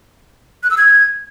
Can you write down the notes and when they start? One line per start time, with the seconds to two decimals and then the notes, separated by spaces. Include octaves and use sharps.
0.63 F#6
0.71 E6
0.78 G#6